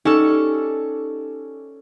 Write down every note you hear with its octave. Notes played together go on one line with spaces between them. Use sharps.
C#4 D#4 G4 A4 D5